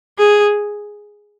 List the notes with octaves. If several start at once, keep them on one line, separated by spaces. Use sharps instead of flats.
G#4